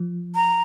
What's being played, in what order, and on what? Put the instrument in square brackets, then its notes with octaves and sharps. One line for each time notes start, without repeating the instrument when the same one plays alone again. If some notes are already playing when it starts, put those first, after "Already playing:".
Already playing: [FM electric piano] F3
[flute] A#5